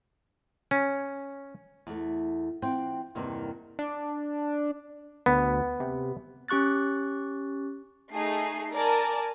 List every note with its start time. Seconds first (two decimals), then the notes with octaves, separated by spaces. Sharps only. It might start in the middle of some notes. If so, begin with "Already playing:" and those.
0.71 C#4
1.87 E2 A3
2.62 E3 C4 F4 F#5 G5
3.15 E2 G2 C3 D#3 A#3
3.79 D4
5.26 D2 B3
5.80 C3
6.48 C#4 G4 C#6 F#6 A6
8.12 A3 D#4 G#4 C7
8.73 A#4 D5 G#5 A5